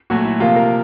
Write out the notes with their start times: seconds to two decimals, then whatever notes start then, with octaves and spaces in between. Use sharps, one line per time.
0.10 A#2 F#3 A3 F#4
0.25 E4
0.40 C3 F3 A#3 F4
0.56 A#4